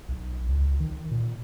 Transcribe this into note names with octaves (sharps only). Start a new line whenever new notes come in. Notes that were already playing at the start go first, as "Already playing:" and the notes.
B1
C#2
D#3
A#2